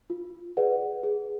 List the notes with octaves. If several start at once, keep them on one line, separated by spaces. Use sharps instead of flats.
F4
G#4 B4 D5 F#5
G#4